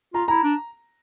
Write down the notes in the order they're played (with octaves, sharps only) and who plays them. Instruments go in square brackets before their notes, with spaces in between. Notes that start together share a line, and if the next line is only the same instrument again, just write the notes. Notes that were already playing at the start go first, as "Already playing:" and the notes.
[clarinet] F4 [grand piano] A#5
[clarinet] E4 [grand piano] A#5
[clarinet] D4